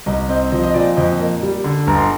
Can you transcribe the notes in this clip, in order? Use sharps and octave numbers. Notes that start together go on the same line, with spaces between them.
C2 D#5
C4 D#5
F3 D#5
D#5
A#2 D5
F2 D#5
A#3
G3
D3
G1 A#5
C6